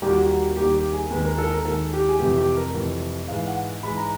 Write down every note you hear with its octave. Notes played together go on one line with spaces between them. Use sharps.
D#2 D#3 G3 A#3 G4
F#4
F#4
D#2 D#3 G3 A#3 G4
G4
G#4
D#2 D#3 G#3 B4
A#4
A4
A#4
D#2 D#3 G#3 A4
G4
G#4
F2 C3 E3 A3 G4
G4
A#4
F2 C3 E3 A3
G#2 E3 G#3 F5
F#5
G#2 E3 G#3 B5
A#5